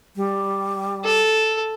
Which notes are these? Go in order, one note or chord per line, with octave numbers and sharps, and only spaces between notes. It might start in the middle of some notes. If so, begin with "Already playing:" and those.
G3
A4